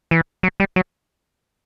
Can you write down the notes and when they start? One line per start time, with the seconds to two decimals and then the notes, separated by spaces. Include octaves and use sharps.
0.11 E3
0.43 F#3
0.60 G3
0.76 F#3